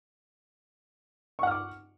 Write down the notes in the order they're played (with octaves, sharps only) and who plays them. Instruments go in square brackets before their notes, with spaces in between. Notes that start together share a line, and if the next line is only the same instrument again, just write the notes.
[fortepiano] C#6
F#5
F6
D6